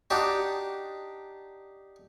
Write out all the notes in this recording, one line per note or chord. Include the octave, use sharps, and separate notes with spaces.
D4 D#4 F#4 G4